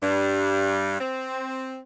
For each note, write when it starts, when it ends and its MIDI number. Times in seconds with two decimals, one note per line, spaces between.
0.01 0.96 43
1.00 1.78 60